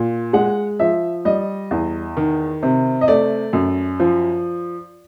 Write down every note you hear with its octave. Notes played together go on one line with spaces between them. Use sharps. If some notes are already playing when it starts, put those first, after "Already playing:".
Already playing: A#2
G#3 F#5
F3 E5
G3 D#5
E2
D#3
C3
D#5
A3 D5
F#2
F3